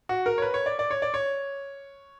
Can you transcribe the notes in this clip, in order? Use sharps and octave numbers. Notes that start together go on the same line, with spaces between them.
F#4
A#4
C#5
B4
C#5
D5
D5
C#5
D5
C#5